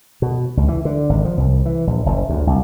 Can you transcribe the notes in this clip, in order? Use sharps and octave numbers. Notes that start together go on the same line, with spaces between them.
B2
C#2
E3
D3
G#1
F3
C2
E3
A#1
F#1
D2
C2